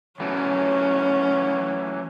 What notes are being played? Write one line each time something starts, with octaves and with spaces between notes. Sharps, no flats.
E3 F#3 A3 C#4